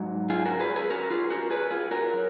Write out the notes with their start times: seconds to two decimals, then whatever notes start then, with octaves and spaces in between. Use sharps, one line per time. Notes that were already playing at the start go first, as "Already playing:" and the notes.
Already playing: G#2 F#3
0.30 F4 G#4
0.46 F#4 A#4
0.60 G#4 B4
0.76 G#4 B4
0.90 F#4 A#4
1.10 F4 G#4
1.31 F#4 A#4
1.51 G#4 B4
1.71 F4 G#4
1.91 F#4 A#4
2.13 F#3